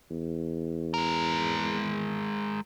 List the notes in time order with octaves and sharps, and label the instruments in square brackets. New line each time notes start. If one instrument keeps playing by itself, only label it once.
[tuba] E2
[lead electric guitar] G#3 A#4